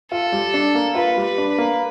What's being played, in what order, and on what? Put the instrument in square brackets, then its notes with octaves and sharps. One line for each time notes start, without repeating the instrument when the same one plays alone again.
[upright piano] F4 [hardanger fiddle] A4
[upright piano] G3
D4
A#3
[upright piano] F4 [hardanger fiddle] B4
[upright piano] G3
[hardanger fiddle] B4
[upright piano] D4
[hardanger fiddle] B4
[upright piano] A#3